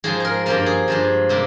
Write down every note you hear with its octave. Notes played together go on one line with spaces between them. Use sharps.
G#2 F3 G#3 G#4
G#4 A#4
G2 F3 A#3 A#4
G#4
G2 F3 G#3
C3 G3 A#3